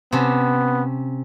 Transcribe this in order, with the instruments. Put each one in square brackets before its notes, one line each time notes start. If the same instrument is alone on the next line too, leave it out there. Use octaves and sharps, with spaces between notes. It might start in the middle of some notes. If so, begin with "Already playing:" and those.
[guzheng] C3 C#4 A5 [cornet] B3